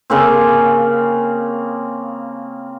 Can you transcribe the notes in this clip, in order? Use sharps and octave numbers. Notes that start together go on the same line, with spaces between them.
C#3 A#3 C4